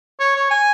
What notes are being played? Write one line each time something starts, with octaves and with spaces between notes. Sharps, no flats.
C#5
C#5
G#5